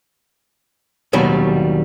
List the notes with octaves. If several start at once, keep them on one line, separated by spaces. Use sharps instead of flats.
D#2 B2 F#3 G3